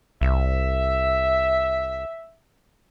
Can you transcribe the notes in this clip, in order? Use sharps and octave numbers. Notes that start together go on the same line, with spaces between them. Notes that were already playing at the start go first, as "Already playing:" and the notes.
C2 E5